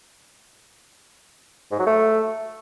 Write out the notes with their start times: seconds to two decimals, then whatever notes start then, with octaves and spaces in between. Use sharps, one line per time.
1.71 G#2
1.79 F#3
1.86 A3